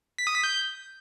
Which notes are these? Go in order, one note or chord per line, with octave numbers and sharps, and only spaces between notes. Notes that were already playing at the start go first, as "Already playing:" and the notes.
B6
D#6
B6
G6